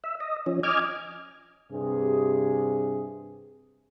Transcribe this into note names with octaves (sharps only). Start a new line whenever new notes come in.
E5
D#5
F3 C#4
D#5 G#5 D6 F6 G#6
G2 C3 G#4